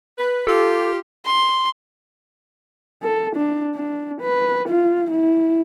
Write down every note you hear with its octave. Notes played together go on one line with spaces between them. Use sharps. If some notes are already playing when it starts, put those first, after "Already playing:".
B4
F4 G4 A4
C6
A4
D4
D4
B4
F4
E4